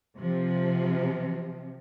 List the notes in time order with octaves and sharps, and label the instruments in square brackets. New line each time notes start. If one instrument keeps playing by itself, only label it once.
[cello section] C3 F3